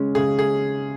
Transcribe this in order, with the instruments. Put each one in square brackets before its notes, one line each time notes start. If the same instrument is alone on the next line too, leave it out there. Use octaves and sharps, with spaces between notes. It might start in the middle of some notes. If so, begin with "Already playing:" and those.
Already playing: [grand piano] C#3 G#3 C#4
[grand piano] C#3 [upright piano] G#4
[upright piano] G#4